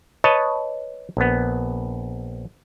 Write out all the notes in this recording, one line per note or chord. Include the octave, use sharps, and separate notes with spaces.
B4 C#5 D#5 A5
A#1 B3